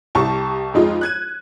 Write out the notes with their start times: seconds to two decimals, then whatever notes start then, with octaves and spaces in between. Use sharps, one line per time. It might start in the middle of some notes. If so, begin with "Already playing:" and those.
0.15 C2 G4 A5 C#6
0.74 F2 G#3 D#4 F4
1.01 F#6 G#6 D#7